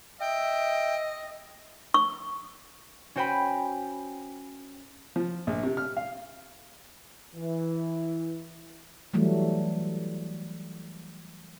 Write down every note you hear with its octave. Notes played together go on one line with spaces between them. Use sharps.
D#5 E5 G5
C#6
C#4 F#4 C5 G5 G#5 B5
F3
A#1
C3
F6
F5
E3
E3 F#3 G3 A3